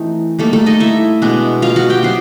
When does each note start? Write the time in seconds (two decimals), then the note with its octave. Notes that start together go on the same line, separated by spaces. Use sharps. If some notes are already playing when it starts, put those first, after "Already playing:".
Already playing: E3 A3 C4 D#4
0.39 G3 A3 A#3 D#4 A4
0.53 A3 A4
0.66 D#4 D#5
0.80 E4 E5
1.22 B2 G#3 B3 D4
1.62 F4 F5
1.76 F#4 F#5
1.90 G4 G5
2.03 F#3 B3 E4 C5 C6